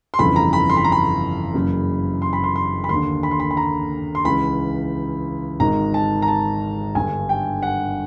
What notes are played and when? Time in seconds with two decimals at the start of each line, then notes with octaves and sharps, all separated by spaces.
0.14 C6
0.19 G1 F2 C#3 E3 B5
0.36 A#5
0.53 B5
0.70 C6
0.77 B5
0.85 A#5
0.92 B5
1.54 F#1 F#2 C#3 E3
2.22 C6
2.33 B5
2.44 C6
2.56 C6
2.84 B5
2.89 D#2 D3 C6
3.23 B5
3.31 C6
3.40 B5
3.51 B5
3.57 A#5
4.15 C6
4.25 C#2 C#3 E3 B5
5.60 G#1 G#2 D#3 A#5
5.94 A5
6.22 A#5
6.28 A5
6.95 G1 G2 D3 G#5
7.29 G5
7.63 F#5